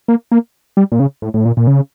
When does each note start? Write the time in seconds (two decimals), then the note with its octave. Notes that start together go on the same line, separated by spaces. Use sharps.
0.08 A#3
0.32 A#3
0.77 G3
0.92 A#2
1.00 C#3
1.22 A2
1.34 A2
1.45 A#2
1.57 A#2
1.67 C#3